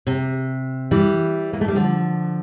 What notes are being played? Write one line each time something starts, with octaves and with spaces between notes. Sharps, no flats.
C3
E3 G3
A#3
A3
G3
D3 F3